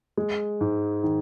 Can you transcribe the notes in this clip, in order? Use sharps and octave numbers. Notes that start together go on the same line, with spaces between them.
G#3
G#2
D#3